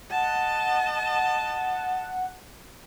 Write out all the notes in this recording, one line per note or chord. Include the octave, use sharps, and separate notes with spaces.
D#5 F#5 A5